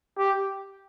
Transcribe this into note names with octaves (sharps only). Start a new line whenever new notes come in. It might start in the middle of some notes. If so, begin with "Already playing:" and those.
G4